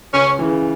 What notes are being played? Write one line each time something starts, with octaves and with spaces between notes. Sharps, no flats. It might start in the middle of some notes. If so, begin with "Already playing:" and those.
C#2 C#4
C#3 E3